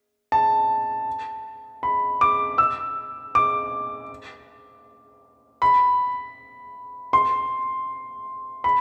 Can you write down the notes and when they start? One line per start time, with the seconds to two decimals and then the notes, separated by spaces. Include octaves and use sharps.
0.32 A5
1.83 B5
2.21 D6
2.58 E6
3.35 D6
5.62 B5
7.13 C6
8.64 B5